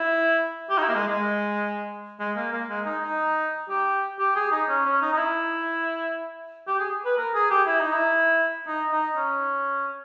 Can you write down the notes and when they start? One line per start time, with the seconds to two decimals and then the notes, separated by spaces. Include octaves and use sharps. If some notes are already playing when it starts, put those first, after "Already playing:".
Already playing: E4
0.70 G4
0.78 D#4
0.83 E4
0.89 A#3
0.95 G#3
1.08 G#3
2.20 G#3
2.36 A#3
2.52 A#3
2.69 G#3
2.86 D#4
3.02 D#4
3.69 G4
4.19 G4
4.36 G#4
4.52 D#4
4.69 C#4
4.85 C#4
5.02 D#4
5.13 D#4
5.18 E4
6.67 G4
6.80 G#4
7.05 B4
7.17 A#4
7.34 G#4
7.50 G4
7.67 E4
7.80 D#4
7.93 E4
8.67 D#4
8.92 D#4
9.17 C#4